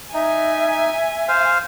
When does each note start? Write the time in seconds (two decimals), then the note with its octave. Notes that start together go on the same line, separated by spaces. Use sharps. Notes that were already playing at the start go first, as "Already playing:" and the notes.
0.14 D#4 E5 G#5
1.28 C5 F5